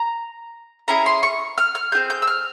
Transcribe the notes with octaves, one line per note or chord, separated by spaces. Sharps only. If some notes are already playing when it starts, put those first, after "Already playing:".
Already playing: A#5
C#4 E4 G#4 A#5
C6
C#6
F6
F6
C4 F4 G#4 G6
G6
E6
F6